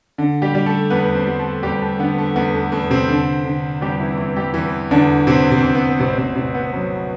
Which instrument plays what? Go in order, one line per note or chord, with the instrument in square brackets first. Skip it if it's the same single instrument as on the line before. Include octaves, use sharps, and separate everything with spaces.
[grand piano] D3
G3 G4
G3
A3 A4
E2 B3 B4
C4 C5
G3
A3 A4
E2 G3 G4
A3
D3 B3
A3
E2 B3
A3
E2 A3
C3 C4
D3
D3
E2 G3 G4
E3 E4
E2 E3 E4
G3 G4
E2 E3 E4
E2 D3 D4
E2 C3 C4
C3 C4
E2
B3
A1 C3 C4
C3 C4
A1 C3 C4
B3
F#3